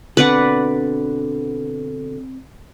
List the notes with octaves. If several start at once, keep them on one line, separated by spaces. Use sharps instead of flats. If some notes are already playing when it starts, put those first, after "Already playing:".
B2 D3 C4 B4 D5 F#5